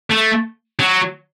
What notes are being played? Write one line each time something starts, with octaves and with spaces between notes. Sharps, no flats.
A3
F#3